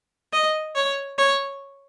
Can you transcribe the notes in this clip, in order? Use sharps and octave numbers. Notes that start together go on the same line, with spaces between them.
D#5
C#5
C#5